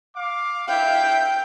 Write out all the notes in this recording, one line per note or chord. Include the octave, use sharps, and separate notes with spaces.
F5 D6
E4 E5 F5 G5